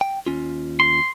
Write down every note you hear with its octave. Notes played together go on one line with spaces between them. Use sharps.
G5
D#2 C#4 F4
C6